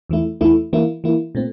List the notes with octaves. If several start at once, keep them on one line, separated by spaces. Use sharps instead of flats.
E2 E3 A3 E4
E2 E3 A3 E4
E3 A#3 E4
E3 A#3 E4
A#2 A3 C4